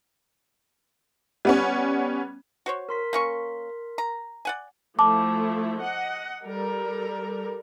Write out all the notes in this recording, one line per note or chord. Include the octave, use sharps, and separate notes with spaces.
G3 B3 C#4
F#4 C5 C#5
A#4 C6 B6
A#3 C#4 C#6
A#5
D5 F#5 G#5
F3 A3 E4 A5 D6
D#5 F#5
G3 A4 A#4